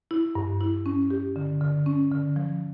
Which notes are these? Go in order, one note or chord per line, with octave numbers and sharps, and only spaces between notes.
E4
G2
E4
C#4
G4
D3
D3
C#4
D3
F3